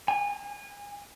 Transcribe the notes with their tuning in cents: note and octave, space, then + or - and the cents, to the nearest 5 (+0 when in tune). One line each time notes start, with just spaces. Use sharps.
G#5 -30